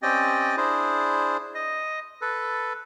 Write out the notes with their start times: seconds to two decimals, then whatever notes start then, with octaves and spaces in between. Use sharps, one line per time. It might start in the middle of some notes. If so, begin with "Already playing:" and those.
0.02 C4 C#4 G4 D5 D#5 G5
0.57 D4 E4 G#4 C5
1.55 D#5
2.22 A4 B4